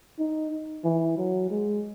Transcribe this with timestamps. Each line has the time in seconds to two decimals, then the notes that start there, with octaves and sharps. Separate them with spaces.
0.19 D#4
0.84 E3
1.18 F#3
1.50 G#3